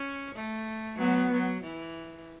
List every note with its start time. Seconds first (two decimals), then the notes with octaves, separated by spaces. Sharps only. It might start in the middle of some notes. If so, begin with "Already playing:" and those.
Already playing: C#4
0.35 A3
0.99 F#3 B3
1.32 F#3
1.63 E3